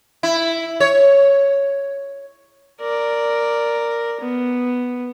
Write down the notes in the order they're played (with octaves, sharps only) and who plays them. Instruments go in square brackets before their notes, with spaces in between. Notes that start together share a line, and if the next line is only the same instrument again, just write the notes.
[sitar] E4
C#5
[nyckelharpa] A#4 D5
B3